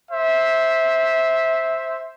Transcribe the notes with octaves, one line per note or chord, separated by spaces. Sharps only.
C5 E5